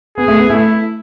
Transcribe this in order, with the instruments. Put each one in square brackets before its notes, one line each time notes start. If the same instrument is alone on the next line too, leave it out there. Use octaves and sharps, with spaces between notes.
[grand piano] B3 [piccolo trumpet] G#4
[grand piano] A3
B3
[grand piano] A3 [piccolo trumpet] E4